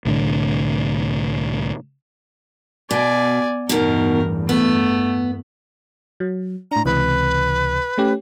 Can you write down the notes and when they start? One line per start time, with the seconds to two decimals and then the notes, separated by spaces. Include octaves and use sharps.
0.05 C2 A2 D3
2.91 B2 D5 G#5
3.69 A1 E2 G2 B2 D#3 A#4
4.49 A3 B3
6.20 F#3
6.71 A2 D4 A#5
6.86 C#2 C3 E3 B4
7.98 A3 C#4 G4